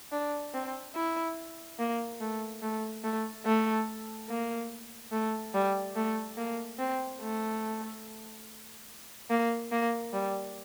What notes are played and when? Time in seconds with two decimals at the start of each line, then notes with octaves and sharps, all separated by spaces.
0.12 D4
0.54 C4
0.95 E4
1.79 A#3
2.20 A3
2.62 A3
3.04 A3
3.45 A3
4.29 A#3
5.12 A3
5.54 G3
5.96 A3
6.37 A#3
6.79 C4
7.21 A3
9.30 A#3
9.72 A#3
10.13 G3